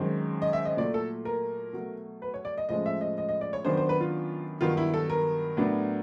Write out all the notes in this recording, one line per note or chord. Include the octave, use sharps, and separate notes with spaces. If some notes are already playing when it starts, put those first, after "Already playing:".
Already playing: F#2 D#3 G#3 C4
D#5
E5
D#5
A#2 F#3 A3 D5
A4
A#4
B2 F#3 A3
B4
C#5
D5
D#5
A2 F3 G#3 C#4 D#5
E5
D#5
D#5
D#5
D5
C#5
F#2 D#3 F#3 B3 D4 C5
C5
B4
F4
G2 D#3 F#3 B3 F4
E4
A4
A#4
A2 F#3 B3 D4